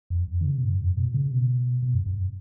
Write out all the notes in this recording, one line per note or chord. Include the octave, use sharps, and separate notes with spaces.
F2
F#2
F2
D#3
C#3
B2
G#2
F#2
F2
F#2
B2
A#2
C#3
B2
B2
F#2
F#2